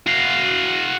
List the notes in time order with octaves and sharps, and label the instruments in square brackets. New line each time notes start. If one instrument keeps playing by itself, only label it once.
[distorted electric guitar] F#4 F5